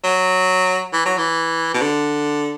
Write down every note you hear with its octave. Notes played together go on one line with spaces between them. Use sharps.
F#3
E3
F#3
E3
B2
D3